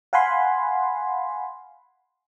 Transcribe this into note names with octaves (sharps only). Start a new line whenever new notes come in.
F5 F#5 G#5 B5 C6